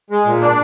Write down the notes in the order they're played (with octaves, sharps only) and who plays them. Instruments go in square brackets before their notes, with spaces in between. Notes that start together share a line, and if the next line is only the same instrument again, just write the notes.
[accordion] G#3
A#2
D4